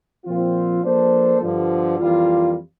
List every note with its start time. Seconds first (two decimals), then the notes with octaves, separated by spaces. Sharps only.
0.25 A#2 F3 C4 F4
0.83 F3 A#3 D4 A4 C5
1.41 G2 D3 F3
1.99 F2 E3 G3 A#3 F4